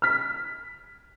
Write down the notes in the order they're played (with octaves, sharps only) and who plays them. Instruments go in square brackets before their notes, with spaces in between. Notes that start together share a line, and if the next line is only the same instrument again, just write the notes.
[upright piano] F6 B6